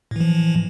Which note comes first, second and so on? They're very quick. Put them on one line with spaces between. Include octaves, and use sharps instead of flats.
A2 E3 F3